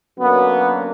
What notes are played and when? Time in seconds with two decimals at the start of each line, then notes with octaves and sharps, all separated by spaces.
0.18 F#2 D3 F#3 A#3 B3